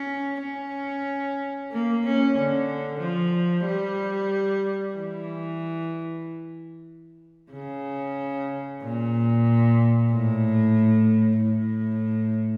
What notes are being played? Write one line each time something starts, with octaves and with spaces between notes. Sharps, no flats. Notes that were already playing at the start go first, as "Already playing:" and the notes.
Already playing: C#4
C#4
A#3
C#4
D3
F3
G3
E3
C#3
A#2
A2
A2